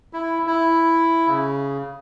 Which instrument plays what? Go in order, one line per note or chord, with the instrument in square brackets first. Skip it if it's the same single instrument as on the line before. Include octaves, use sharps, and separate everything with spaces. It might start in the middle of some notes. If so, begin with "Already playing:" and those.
[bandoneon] E4
E4
C#3